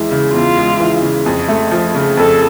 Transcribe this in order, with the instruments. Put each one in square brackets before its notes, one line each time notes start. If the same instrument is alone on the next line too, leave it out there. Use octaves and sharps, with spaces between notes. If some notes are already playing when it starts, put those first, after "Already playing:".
Already playing: [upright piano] E2 E3 G#3
C#3
[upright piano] E2 [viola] F4
[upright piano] G#3
E3
C#3
F2
A3
F3
C#3
[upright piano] F2 [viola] A4